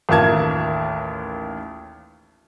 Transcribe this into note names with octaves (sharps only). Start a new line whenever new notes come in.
A1 D#2 F4 A#4 A5 G#6